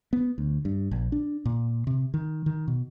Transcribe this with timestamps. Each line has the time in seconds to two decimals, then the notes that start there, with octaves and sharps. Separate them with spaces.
0.13 B3
0.38 D2
0.65 G2
0.91 A#1
1.12 D4
1.45 A#2
1.87 C3
2.14 D#3
2.46 D#3
2.68 B2